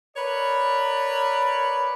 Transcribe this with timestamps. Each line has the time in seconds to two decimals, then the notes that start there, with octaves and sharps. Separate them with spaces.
0.16 A#4 B4 C#5 D5